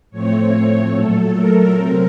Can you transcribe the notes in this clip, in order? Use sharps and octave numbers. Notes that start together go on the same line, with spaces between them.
A2 F3 A3 C4 C#5
C#5
A#2 F#3 A3 A4
A#4
C3 F#3 C4